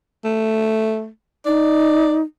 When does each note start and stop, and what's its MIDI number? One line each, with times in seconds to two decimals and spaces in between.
0.24 1.08 57
1.46 2.22 63
1.46 2.18 74